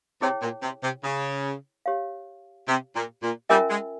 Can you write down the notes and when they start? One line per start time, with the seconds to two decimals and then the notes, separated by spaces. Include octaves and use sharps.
0.21 C3 E4 G#4 C#5 G5
0.42 A#2
0.63 C3
0.83 C3
1.04 C#3
1.86 G4 C#5 F5
2.68 C3
2.95 A#2
3.22 A#2
3.49 G3 C#4 F4 A#4 E5 G#5
3.70 G#3